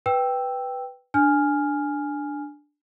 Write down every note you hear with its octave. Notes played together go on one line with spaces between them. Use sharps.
B4 G5 E6
D4 G#5 F6